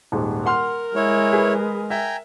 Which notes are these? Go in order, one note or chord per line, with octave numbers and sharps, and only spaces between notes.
D#1 G#2
A#4 F#5 C6 F6
G#3 E4 C#5
G#4 B4
E5 G5 G#5 A#5